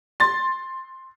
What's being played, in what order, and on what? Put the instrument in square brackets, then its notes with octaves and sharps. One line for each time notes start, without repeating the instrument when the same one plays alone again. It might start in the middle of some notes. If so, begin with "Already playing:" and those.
[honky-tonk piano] C6 A6